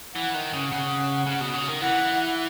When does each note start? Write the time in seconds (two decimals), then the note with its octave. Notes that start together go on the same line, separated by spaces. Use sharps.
0.16 E3 F#5
0.34 D#3
0.54 C#3
0.72 C#3 F#5
1.26 C#3
1.41 B2
1.54 C#3
1.68 D#3
1.81 E3 F#5